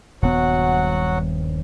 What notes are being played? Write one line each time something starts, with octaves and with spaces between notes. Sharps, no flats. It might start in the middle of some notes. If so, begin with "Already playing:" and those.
D#1 G2 F#3 B3 F#4 F#5